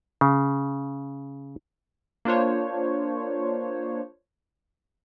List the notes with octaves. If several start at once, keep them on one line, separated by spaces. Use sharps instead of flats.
C#3
A#3 D4 F4 C5 C#5